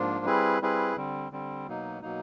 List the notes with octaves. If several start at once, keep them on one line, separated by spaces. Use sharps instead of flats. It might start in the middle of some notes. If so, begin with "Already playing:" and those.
Already playing: G#2 F3 A#3 D4 F4
G3 C4 E4 G#4 B4
G3 C4 E4 G#4 B4
D3 G3 C4
D3 G3 C4
B2 F#3 A#3 D#4
B2 F#3 A#3 D#4